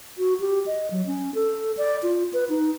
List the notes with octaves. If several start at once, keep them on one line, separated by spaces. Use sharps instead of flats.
F#4
G4
D#5
F#3
C#4
A4
D5
F4
B4
D#4